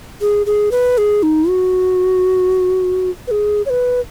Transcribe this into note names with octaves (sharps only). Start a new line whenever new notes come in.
G#4
G#4
B4
G#4
D#4
F#4
B4
G#4
C#5
B4